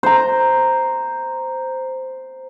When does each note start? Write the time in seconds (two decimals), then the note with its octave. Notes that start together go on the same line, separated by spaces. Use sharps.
0.03 C5 A#5